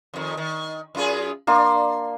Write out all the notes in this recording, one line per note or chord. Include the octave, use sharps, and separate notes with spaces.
F2 D#3
D#3
F#2 F4 G#4
A#3 D4 C6